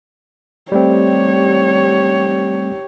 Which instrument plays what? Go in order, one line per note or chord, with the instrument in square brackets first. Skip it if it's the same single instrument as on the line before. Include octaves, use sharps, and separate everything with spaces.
[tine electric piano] G3 A3 C4 [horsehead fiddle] G4 C#5